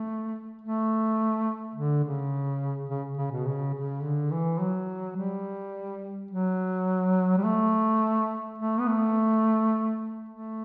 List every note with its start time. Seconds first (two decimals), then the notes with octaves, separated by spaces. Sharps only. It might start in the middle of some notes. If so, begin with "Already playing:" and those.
Already playing: A3
0.61 A3
1.75 D3
2.04 C#3
2.90 C#3
3.17 C#3
3.32 B2
3.46 C#3
3.74 C#3
4.03 D3
4.31 E3
4.60 F#3
5.16 G3
6.31 F#3
7.37 G3
7.44 A3
8.58 A3
8.80 B3
8.87 A3
10.29 A3